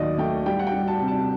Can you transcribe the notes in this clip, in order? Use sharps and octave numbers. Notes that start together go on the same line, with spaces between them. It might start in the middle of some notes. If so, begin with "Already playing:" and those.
Already playing: D#2 D#3 F#3 D5 D#5
A3 G5
G3 G5
F#5
G5
G3
A5
C3
A5